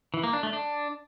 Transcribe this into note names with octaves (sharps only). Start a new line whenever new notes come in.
E3
A#3
D4
A3
D4